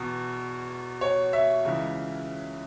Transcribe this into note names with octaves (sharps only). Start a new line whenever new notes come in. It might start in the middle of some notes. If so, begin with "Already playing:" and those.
Already playing: E2 B2
C#5
E5
C#2 C#3 E3 G#3